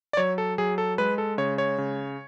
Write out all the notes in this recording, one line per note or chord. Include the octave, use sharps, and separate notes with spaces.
D5
F#3 C#5
A4
F#3 G#4
A4
G#3 B4
A4
C#3 C#5
C#5
C#3